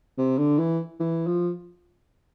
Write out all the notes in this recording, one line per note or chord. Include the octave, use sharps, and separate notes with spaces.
C3
D3
E3
E3
F3